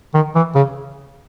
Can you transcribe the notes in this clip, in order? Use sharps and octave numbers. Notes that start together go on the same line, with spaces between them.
D#3
E3
C#3